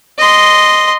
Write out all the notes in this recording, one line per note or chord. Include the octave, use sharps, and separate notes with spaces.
D#5 C6